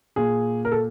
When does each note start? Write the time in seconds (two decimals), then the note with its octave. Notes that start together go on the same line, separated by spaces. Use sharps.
0.16 A#2 G#4
0.65 A#4
0.72 A4